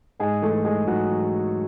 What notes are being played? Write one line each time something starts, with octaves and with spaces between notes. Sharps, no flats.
G#2 G#3 G#4
E3 A3 A4
E3 G#3 G#4
G#2 F#3 F#4
E3